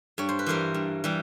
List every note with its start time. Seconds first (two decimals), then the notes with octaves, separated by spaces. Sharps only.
0.18 G2 C#5
0.29 C5
0.39 B4
0.46 E3 G3 A#4 C5
0.74 G2
1.04 E3 G3